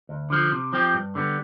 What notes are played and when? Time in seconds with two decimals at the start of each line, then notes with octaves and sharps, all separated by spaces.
0.09 D2
0.30 D3 F3
0.52 C3
0.73 F3 C4 G4
0.94 G2
1.15 D3 G3 B3